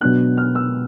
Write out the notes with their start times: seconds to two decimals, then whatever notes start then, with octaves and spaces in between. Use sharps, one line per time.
0.01 B2 F#3 B3 D4 F#6
0.37 F6
0.55 E6